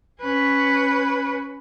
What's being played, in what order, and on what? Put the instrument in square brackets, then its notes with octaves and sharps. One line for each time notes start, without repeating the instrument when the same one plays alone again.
[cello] C#4 B4